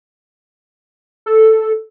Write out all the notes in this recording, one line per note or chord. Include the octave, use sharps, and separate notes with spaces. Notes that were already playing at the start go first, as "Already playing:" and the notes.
A4